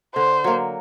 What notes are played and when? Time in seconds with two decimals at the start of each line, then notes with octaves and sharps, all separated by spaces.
0.15 D3 C5
0.44 F#3 A#3